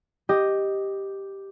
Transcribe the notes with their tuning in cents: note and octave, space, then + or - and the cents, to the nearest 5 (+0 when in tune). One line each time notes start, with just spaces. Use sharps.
G4 +0 D#5 +0